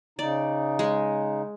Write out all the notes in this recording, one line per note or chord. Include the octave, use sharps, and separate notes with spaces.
C#3 D#4 D5
G#3